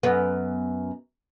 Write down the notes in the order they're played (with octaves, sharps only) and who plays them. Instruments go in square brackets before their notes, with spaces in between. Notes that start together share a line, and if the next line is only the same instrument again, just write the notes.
[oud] F#2 B3